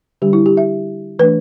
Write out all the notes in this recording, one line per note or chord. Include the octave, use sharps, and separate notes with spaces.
D3 G3 D4 G4
E4
G4
E5
E3 A3 D4 B4